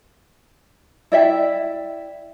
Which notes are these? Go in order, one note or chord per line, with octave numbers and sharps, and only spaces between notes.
E4 D5 E5 G5